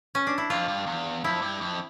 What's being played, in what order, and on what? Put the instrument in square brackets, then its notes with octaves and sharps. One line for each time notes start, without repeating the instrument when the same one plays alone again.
[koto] C#4
D4
E4
[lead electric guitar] F2 [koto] F4
[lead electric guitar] G2
E2
[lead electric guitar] F2 [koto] E4
[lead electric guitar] G2
F2